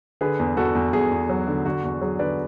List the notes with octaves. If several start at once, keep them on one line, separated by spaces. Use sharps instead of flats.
D3 G#4 B4
E2
E2 F#4 A4
E2
E2 G#4
E2
F#3
D3
D3 F#4
E2 F#4
F#3 G#4
D3 B4 D5